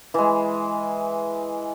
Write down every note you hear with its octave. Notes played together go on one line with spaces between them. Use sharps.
E3 G#3